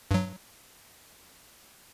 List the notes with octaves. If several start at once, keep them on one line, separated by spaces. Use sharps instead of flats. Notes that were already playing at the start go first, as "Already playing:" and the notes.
G2 F#3